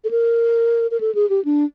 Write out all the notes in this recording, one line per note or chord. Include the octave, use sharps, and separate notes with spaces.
A4
A#4
A#4
A4
G#4
G4
D4